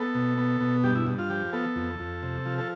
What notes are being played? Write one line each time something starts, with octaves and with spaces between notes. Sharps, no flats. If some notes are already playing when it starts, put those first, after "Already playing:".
Already playing: B3 A4
B2
B3
B2
G2 G4
E4
G2
F4
F3 G4
B3 A4
F2
F2
C3
F3
A4